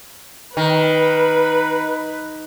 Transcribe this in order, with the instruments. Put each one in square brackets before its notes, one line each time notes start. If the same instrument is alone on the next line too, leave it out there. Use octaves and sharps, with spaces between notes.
[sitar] D#3 [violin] B4